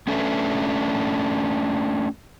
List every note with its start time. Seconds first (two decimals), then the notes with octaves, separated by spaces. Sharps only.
0.07 A3 C#4 D4 A4 E5